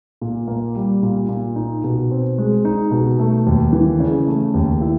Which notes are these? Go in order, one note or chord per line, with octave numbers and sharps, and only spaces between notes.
A#2
A#3
G3
A#2
A#2
D#4
B2
C4
G#3
D#4
B2
A3
D#2
E3
C#3
A3
D#2
E4